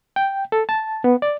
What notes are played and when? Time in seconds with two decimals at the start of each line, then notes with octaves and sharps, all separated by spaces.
0.16 G5
0.52 A4
0.69 A5
1.04 B3
1.22 D5